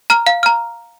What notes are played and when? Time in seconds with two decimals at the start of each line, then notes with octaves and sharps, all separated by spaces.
0.10 A#5 F6
0.27 F5
0.43 A#5 F6